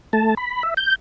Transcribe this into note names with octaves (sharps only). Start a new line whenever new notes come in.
A3 A5
B5
E5
G6